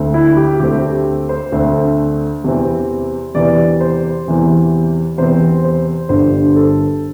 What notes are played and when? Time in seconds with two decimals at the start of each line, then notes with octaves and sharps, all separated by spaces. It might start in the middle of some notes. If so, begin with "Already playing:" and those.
Already playing: D2 D3 A3 C4
0.14 E4
0.37 G4
0.60 D2 D3 A3 C4 G4
1.29 C5
1.52 D2 D3 A3 C4
2.44 E2 C3 E3 C4
3.35 E2 C3 E3 C4 D5
3.81 C5
4.27 E2 C3 E3 C4
5.18 E2 C3 E3 C4 C5
5.64 C5
6.09 G1 G2 D3 C5
6.56 A4